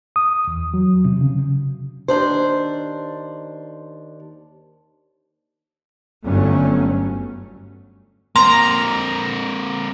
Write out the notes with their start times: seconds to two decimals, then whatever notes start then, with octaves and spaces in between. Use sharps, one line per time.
0.16 D#6
0.47 E2
0.74 F#3
1.05 C3
1.21 C#3
2.08 D#2 B2 D4 C5
6.26 G1 G2 D3 F#3 A3 C#4
8.36 A#3 C4 A#5 C6